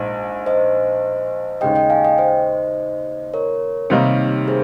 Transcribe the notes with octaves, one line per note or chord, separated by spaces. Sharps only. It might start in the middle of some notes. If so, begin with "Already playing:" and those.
Already playing: A#1 G#2 C5 D#5
C5 D#5
D#2 C#3 G#3 D#5 G5
D#5 G5
F5 G#5
D#5 G5
C5 D#5
A#4 C#5
C3 D#3 G3 A#3 D#4
G#4 C5